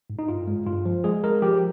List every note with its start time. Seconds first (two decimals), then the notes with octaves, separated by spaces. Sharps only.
0.10 G#2
0.19 D#4
0.28 G2 F4
0.47 G#3
0.67 G2 F4
0.85 F3
1.04 G#3 G#4
1.24 G#3 A#4
1.42 F3 G4